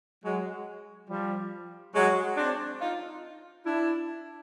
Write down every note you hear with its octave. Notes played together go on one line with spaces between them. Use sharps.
F#3 G#3
F3 G3
F#3 G#3
C4 D4
D#4 F4
D4 E4